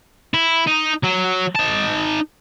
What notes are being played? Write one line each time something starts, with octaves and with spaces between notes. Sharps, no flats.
E4
D#4
F#3
D#4 A5